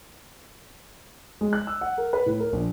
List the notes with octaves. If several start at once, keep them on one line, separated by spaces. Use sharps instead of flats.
G#3
F#6
E6
F#5
A#4
B4
A2
A#4
A#1